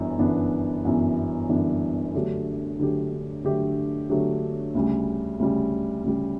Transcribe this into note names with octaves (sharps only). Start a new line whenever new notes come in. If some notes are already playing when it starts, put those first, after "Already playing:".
Already playing: G1 F#2 E3 B3 D4
G1 F#2 E3 B3 D4
G1 F#2 E3 B3 D4
G1 F#2 E3 B3 D4
D3 F#3 A3 D4 G4
D3 F#3 A3 D4 G4
D3 F#3 A3 D4 G4
D3 F#3 A3 D4 G4
D2 C#3 G3
D2 C#3 G3
D2 C#3 G3